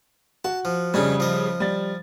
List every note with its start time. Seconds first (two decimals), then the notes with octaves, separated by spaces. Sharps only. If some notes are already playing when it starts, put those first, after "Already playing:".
0.44 F#4 A5
0.65 F3
0.94 F2 C#3 G3 C#4 D#4
1.20 F3 D#5
1.60 G3 A6